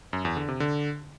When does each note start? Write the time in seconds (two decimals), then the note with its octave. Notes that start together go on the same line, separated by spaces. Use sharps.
0.13 F#2
0.25 E2
0.37 D3
0.48 C3
0.60 D3